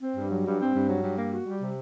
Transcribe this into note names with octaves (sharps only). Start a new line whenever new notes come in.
C4
G2
F#3
G2
C4
G2
F#3
G2
A#3
F#4
G3
C3